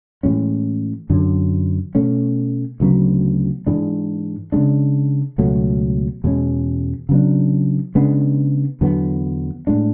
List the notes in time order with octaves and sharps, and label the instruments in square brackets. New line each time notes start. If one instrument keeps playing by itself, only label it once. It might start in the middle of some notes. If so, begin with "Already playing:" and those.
[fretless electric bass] A2 E3 G#3 C#4
F#2 D3 F#3
B2 A3 C#4
D2 C#3 F#3 B3
G#2 E3 G#3 D4
C#3 G#3 D4
C#2 B2 F#3 A3
E2 B2 G#3 C#4
C#3 F#3 B3 D4
C#3 G#3 B3 D4
E2 D3 F#3 B3
A2 G#3 D4